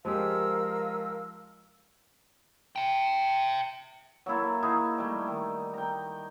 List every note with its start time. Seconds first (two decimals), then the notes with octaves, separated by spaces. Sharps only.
0.05 F3 G#3 G4 A#4 F5 E6
2.76 E5 G5
4.26 F#3 A#3 E4 A4
4.62 D#4 E4 F#4 G#4
4.98 G3 A3
5.27 D#3
5.74 G5 A#5